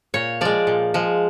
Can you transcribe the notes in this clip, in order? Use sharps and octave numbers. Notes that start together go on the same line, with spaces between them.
A#2 C#5
F3 G#3 D5
A#2
F3 G#3